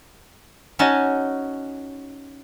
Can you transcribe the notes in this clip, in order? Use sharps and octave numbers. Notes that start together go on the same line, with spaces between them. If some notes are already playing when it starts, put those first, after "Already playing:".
C#4 D#4 F#4 D#5 G#5 A5